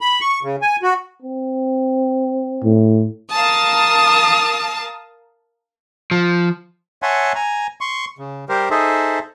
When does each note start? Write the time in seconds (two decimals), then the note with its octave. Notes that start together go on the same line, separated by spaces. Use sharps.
0.01 B5
0.21 C#6
0.43 C#3
0.62 G#5
0.82 F#4
1.23 C4
2.64 A2
3.33 A#4 F5 A5 D#6
6.11 F3
7.02 C#5 E5 F#5 G#5 A5 C6
7.35 G#5 A#5
7.81 C6 C#6
8.18 C#3
8.49 G3 G4 A#4 C5
8.71 D#4 G#4 A4 C5 E5